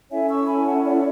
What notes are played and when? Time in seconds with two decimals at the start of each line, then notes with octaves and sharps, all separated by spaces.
0.11 C#4 E4 A4 C#5 E5 G#5
0.29 C#6 E6
0.48 G#5 B5
0.66 F#5 A5
0.85 D5 F#5